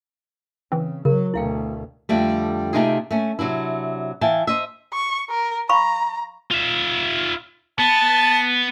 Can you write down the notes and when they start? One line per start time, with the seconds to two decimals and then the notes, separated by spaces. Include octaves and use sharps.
0.72 C#3 E3 C4
1.05 C#3 F#3 A#4
1.34 D2 B2 E4 F5 G5
2.09 F2 D3 G3 A3
2.73 C3 A3 D#4 F4 G4 G#4
3.11 A3 C#4
3.39 C3 F#3 D4 E4
4.21 E3 E4 F5 G5 A5
4.47 C5 D#5 E5
4.93 C#6
5.30 A#4
5.69 F5 A#5 B5 C#6
6.51 F4 E5
7.79 B3 A5